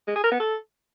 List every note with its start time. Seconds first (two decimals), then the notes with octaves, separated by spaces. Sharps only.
0.07 G#3
0.15 G#4
0.23 A#4
0.31 B3
0.39 A4